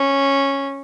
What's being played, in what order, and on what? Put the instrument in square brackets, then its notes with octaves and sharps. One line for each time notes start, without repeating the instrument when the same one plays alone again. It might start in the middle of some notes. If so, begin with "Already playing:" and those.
Already playing: [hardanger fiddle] C#4